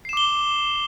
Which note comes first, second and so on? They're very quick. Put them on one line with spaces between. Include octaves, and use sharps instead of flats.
C7 E7 D6 G7